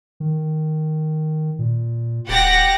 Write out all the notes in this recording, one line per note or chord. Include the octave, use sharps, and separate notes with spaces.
D#3
A#2
D1 G4 F#5 A#6